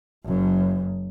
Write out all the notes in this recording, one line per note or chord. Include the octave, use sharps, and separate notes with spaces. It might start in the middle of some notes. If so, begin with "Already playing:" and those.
F#1 F#2